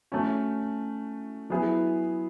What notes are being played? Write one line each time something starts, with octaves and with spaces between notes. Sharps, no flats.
A3 C#4 F#4
F#3 B3 E4 G#4